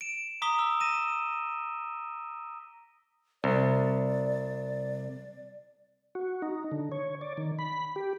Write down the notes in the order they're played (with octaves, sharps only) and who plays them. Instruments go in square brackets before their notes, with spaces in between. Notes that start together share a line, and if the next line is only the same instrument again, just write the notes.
[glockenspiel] D7 E7
A#5 D6 D#6 B6 G7
E6
A#6 D#7 E7
[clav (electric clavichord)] C2 [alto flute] D5
[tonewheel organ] F#4
D#4
D3
C#5
D5
D#3
B5
G4